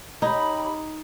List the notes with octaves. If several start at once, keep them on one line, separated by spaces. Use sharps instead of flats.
D#4 G4 C#5 B5